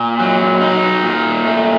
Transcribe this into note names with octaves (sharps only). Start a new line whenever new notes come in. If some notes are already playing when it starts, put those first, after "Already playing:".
Already playing: A#2
F#3
D#4
A#2
A3